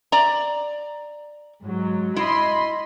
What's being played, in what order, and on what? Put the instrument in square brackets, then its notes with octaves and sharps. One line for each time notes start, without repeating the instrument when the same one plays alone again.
[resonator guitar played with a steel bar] D5 A#5
[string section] G#2 F#3
[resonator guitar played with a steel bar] E4 [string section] D#5 B5 C6